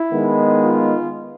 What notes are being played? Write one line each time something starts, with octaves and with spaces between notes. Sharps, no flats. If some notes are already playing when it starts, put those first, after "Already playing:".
Already playing: E4
D#3 G#3 B3
F4